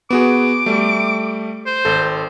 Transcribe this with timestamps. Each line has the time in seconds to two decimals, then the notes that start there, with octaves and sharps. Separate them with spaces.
0.10 B3 F#4 G#4 D6
0.66 G3 A3
1.66 C5
1.85 G#1 A4